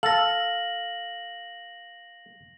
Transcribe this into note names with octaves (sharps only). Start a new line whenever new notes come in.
A4 F5 A#6 F#7